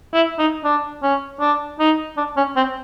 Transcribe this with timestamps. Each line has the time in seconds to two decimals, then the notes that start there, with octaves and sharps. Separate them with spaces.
0.14 E4
0.38 D#4
0.64 D4
1.03 C#4
1.40 D4
1.79 D#4
2.17 D4
2.37 C#4
2.56 C4